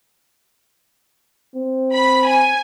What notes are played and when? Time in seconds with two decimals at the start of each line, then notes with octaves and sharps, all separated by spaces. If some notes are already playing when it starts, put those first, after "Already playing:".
1.55 C4
1.94 B5
2.28 G#5